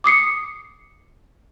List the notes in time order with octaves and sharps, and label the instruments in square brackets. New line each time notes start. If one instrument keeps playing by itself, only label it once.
[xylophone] D6 D#6 C7 C#7